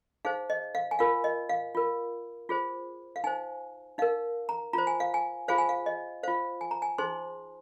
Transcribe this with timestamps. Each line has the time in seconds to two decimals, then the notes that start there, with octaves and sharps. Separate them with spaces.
0.25 D#4 G#4 C5 F5
0.50 D#5
0.75 F5
0.91 G#5
0.99 F4 A#4 F5
1.24 D#5
1.49 F5
1.75 F4 A#4
2.49 F4 G#4 C5
3.16 F5
3.24 D#4 C5 G#5
3.98 D#4 A#4 F5
4.49 A#5
4.73 F4 C5 A#5
4.87 G#5
5.00 F5
5.14 G#5
5.48 F4 G#4 C5 F5
5.58 G#5
5.69 F5
5.86 D#5
6.23 F4 C5 F5
6.61 G#5
6.71 A#5
6.82 G#5
6.98 D#4 G#4 C5 C6